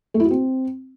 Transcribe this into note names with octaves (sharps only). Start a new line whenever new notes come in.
A3
E4
F#4
C4